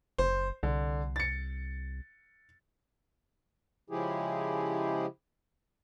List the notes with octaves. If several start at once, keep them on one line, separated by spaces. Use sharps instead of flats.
F#1 C5
C2 D3
A6 C#7
C#3 F3 G#3 E4 G4 G#4